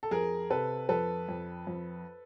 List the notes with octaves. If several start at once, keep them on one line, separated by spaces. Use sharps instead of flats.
A4
F2 G#4 A#4
C3 A4 B4
F2 A4 B4
F2
F2